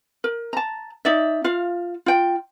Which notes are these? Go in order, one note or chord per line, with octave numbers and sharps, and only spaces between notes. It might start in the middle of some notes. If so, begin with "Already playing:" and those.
A#4
A5 A#5
D#4 D5 E5
F4 F5
F4 G5